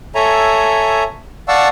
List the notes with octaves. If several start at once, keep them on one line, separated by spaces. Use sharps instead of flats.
A4 C#5 E5 G#5 A#5
D5 F5 F#5 A5 C#6 E6